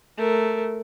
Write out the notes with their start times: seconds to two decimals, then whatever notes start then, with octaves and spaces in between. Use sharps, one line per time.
0.17 A3 A#4